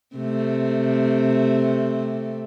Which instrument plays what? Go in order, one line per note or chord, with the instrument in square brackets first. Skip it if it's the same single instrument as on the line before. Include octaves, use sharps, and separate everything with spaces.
[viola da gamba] C3 A3